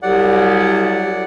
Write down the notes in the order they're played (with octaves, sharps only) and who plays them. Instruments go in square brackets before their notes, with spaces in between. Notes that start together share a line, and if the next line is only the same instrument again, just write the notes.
[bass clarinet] C2 [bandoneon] F#3 D5 F#5 [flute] G4